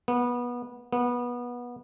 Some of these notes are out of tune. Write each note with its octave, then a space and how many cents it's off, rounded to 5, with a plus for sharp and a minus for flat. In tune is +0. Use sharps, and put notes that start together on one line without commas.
B3 -20
B3 -20